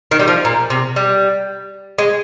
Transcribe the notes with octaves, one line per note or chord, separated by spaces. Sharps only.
D#3
G3
F3
A#2
C3
G3
G#3